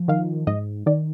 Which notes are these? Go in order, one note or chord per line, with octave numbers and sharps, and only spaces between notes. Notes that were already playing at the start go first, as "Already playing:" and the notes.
Already playing: F3
D#3 F5
G#2 D#5
D#3 D5